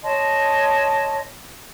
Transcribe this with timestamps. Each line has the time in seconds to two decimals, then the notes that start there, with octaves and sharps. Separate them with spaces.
0.03 C#5 D#5 A5 C6